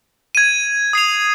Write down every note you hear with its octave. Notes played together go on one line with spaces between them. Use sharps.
G#6 D#7
D#6 C7 F7